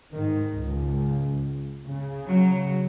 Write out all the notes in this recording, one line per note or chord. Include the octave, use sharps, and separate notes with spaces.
G#2 D#3
C#2
C#3
F#3